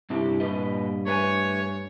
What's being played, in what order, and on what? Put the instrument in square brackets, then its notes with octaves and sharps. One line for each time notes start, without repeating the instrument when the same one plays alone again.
[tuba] G2 [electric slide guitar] C3 E4 G4
[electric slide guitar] A#2 B4 D#5
[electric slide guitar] A3 B4 G#5 [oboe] C#5